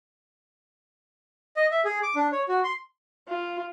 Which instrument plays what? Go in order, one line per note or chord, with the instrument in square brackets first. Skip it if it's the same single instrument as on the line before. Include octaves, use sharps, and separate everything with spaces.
[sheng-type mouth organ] D#5
E5
G#4
D6
D4
C#5
F#4
C6
[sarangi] F4